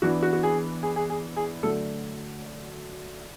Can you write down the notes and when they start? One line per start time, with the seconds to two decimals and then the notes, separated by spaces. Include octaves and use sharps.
0.02 E3 B3 D4 F#4
0.23 F#4
0.33 F#4
0.43 G#4
0.83 G#4
0.96 G#4
1.10 G#4
1.36 G#4
1.63 D3 F#3 A3 D4 A4